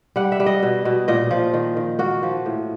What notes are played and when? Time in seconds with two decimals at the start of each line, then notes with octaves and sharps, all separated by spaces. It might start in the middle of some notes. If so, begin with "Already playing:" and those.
0.16 G3 F#5
0.32 E5
0.40 G3
0.46 D#5
0.63 B2
0.85 B2
1.08 A#2 D#5
1.31 F3
1.54 D#3
1.77 D#3
1.99 A#3 F#4
2.23 F3
2.46 A2